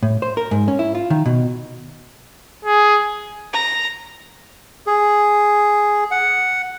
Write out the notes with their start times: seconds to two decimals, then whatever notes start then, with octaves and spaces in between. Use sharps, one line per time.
0.03 A2
0.22 C5
0.37 A#4
0.51 G#2
0.68 C#4
0.79 E4
0.95 F4
1.10 D#3
1.26 B2
2.65 G#4
3.52 A#5
4.87 G#4
6.11 F#5